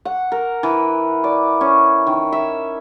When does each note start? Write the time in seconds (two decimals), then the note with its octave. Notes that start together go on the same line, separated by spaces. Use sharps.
0.05 F#5
0.32 A#4
0.63 E3
1.24 D5
1.61 C#4
2.07 D#3
2.32 E5